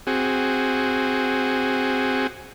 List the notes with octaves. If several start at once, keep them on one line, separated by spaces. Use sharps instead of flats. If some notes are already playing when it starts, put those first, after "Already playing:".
C4 F#4 G#4